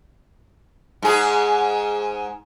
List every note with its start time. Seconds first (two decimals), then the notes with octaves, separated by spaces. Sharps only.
1.02 G#2 G#4